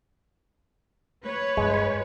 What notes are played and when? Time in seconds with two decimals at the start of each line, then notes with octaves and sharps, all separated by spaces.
1.23 B4 C#5
1.57 G2 G#3